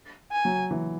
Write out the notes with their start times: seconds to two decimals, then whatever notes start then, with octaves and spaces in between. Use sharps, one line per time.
0.32 G#5
0.45 F#3
0.71 E3